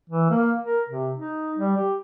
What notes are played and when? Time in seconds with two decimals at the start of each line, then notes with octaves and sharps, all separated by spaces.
0.10 E3
0.31 A#3
0.65 A#4
0.89 C3
1.15 D#4
1.58 G3
1.77 G4